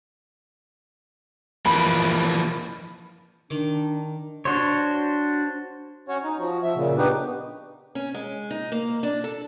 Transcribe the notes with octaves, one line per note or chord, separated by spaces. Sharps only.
E3 F3 A#3 B5
D#3 D4 D6
D4 F#4 C5 C#5
C#4 F#4 C#5
D#4
F3 F#4
F3 E5
A#2 C#3
B3 D4 D#4 F#4 G4 B4
C#4
G#3
D#4
A#3
D4
A4